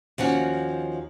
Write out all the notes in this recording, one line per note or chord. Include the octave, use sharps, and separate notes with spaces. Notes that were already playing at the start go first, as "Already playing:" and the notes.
D#2 F3 C#4 F#4